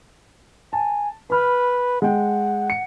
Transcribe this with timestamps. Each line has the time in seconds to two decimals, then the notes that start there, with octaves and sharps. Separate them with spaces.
0.73 G#5 A5
1.30 B4 B5 F6
2.02 G#3 F#5 G5
2.70 C#7